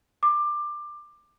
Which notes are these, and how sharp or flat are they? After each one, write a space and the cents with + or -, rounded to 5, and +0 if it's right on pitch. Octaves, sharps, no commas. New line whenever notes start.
D6 +20